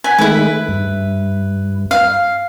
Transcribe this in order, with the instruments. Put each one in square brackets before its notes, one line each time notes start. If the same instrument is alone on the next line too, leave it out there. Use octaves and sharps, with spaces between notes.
[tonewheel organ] F#5 B5 [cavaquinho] G#5
[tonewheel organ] D#3 G#3 A3 [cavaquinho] E4 B4
[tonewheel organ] G2
[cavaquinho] F5